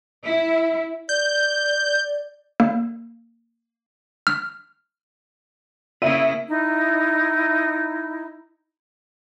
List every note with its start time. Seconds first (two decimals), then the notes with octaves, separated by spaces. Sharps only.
0.24 E4
1.09 D5 G6
2.60 A#3
4.27 F6
6.02 C#3 A#3 E4 E5 D#7
6.49 D#4 E4